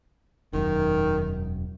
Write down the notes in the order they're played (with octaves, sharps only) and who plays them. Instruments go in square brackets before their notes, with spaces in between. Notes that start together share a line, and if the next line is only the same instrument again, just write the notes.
[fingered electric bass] E1 F#2 [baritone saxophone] D#3